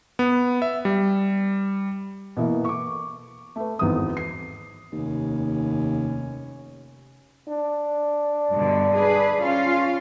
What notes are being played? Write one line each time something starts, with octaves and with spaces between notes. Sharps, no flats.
B3
E5
G3
B2 E3 A#3
C#6 D6
A3 B4
G#1 E2 B3 C4 D#6
C7
F1 D#2 C#4
D4
G2 B2 D3
G#4 B4
C#4 F4 F5